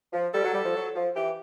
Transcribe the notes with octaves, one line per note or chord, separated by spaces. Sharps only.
F3
G3 A4
F#3
G3
F3
F#3
F3
E3 G4